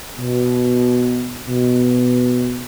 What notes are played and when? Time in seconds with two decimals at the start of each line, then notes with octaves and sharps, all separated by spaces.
0.19 B2
1.47 B2